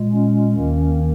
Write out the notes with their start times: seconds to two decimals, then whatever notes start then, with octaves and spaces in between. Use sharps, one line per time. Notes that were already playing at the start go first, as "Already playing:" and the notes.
Already playing: A#2 G#3
0.13 C#4
0.54 D#2 D#3 A#3